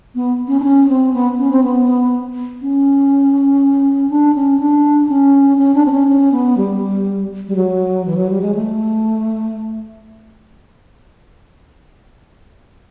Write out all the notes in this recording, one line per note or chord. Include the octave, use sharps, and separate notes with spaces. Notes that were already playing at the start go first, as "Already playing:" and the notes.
B3
C#4
D4
C#4
C4
B3
C#4
C4
B3
C#4
D4
C#4
D4
C#4
C#4
D4
C4
C#4
C#4
B3
G3
G3
F#3
E3
F#3
G3
G#3
A3